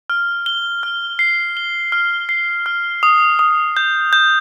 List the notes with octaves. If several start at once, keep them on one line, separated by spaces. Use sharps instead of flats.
F6
G7
F6
C7
G7
F6
C7
F6
D#6
D#6
G6
G6